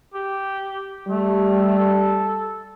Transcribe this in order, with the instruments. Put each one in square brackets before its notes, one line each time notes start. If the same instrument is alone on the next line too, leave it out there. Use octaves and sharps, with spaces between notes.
[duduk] G4
[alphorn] G3 [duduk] A3
[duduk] A4